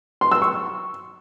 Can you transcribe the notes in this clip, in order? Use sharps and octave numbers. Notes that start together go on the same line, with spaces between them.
C6
E6
C#6